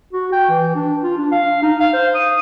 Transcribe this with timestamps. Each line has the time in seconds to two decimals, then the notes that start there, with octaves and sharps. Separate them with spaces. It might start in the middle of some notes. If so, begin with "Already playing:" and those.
0.13 F#4
0.32 G5
0.50 E3
0.75 D4
1.03 F4
1.18 D4
1.32 F5
1.63 D#4
1.80 F5
1.93 C5
2.15 D#6